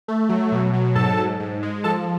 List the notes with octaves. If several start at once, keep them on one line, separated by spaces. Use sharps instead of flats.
A3
F#3
B2
F#3
G#2 A4 A5
G#2
G#2
G#3
F3 A4 A5